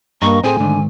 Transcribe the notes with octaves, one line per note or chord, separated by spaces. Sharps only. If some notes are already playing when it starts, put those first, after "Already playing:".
G2 A#3 D#5 A#5 C#6
A2 A3 C4 G#4 C5 G#5
G#2 D3 D#3